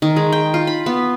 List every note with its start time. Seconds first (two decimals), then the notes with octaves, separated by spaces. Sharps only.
0.02 D#3
0.16 G#3
0.32 G5
0.54 F4
0.67 B5
0.86 B3